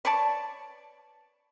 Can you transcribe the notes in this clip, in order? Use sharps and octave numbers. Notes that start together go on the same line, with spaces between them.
B4 C#5 D5 A5